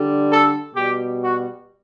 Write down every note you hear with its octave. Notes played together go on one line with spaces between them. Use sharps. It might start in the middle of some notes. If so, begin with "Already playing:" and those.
Already playing: D3 G3
A4
B2 G3 G4
F#4